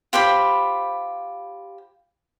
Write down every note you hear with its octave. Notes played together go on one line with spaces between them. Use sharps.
F4 G4 C5 B5